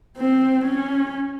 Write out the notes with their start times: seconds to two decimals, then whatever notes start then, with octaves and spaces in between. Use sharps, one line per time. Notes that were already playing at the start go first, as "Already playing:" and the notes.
0.17 C4
0.65 C#4